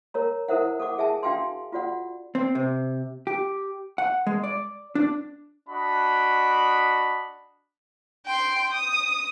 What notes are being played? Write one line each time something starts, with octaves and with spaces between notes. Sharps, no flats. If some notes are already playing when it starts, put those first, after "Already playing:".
A#4 C#5 A#5
E4 A4 A#4 C5 E5 F#5
A4 F#5 D6
G#4 E5 G#5 A5
D4 F#4 F5 G5 G#5 C6
F4 F#4 D5 F#5
C4
C3
G4
F#5
G#3
D5
D4
D4 F#4 D#5 B5
G5 C6
D#6